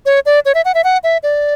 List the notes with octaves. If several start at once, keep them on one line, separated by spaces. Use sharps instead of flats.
C#5
D5
C#5
E5
F#5
E5
F#5
E5
D5